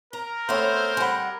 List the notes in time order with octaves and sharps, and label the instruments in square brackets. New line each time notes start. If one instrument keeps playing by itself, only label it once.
[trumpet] A#4 [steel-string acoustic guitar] A#5
[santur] A3 C4 E6 [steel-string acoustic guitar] B3 C#5 [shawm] C5
[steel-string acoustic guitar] G3 F#5 [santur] G#5 B5